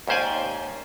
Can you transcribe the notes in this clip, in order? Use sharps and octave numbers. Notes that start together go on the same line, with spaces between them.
D#2 G#2 C#4 C5 D5 G#5